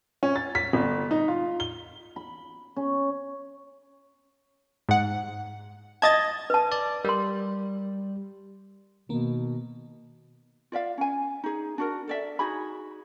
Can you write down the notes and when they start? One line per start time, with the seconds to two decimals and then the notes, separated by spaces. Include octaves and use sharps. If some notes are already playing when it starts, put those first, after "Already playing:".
0.23 C#4
0.36 A6
0.55 B6
0.73 G1
1.11 D#4
1.28 F4
1.60 G7
2.16 B5
2.76 C#4
4.89 G#2 F#5
6.02 D#5 A5 G#6 A6
6.50 B4 A5
6.72 D5
7.05 G3 A#4 C6
9.09 B2 D#3 A#3 B3
10.72 F4 D5 E5 F5
10.98 C#4 G#5
11.44 D#4 G#4
11.78 D4 F#4 A#4
12.08 A4 D5 E5
12.39 D#4 F#4 G#4 B5